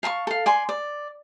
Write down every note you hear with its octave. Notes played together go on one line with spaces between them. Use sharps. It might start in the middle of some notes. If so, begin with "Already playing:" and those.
F5 A5 B5 C#6
A4 F5
D5 G#5 C6
D5